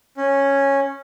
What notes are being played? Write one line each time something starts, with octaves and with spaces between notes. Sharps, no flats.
C#4